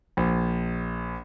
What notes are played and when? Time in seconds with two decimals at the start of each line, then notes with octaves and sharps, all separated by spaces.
0.17 A#1